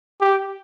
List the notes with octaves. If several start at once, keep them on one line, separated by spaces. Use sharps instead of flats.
G4